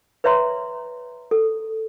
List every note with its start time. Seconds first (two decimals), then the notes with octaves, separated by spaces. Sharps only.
0.24 B4 C#5 E5 A#5 C6
1.31 A4